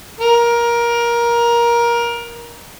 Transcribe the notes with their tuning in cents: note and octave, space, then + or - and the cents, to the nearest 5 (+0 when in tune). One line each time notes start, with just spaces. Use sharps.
A#4 +20